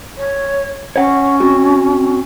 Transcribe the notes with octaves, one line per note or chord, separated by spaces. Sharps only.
C#5
C#4 C#5 F#5
C4 F#4